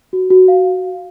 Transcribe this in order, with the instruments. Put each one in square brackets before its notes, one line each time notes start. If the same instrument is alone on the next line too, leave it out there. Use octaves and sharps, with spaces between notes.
[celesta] F#4
F#4
F5